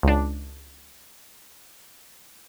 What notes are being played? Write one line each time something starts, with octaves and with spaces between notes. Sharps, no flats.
C#2 D4